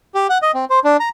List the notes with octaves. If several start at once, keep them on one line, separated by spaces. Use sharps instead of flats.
G4
F#5
D#5
C4
C5
D4
A#5